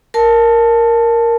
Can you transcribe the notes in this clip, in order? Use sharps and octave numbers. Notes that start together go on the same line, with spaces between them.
A#4 A5